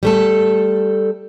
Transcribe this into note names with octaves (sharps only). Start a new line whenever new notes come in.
G3 A3 A4